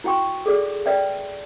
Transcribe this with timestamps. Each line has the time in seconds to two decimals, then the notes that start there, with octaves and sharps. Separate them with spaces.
0.04 E4 F#4 G5 C6 C#6
0.46 G#4 A4 D5
0.86 B4 D5 E5 G5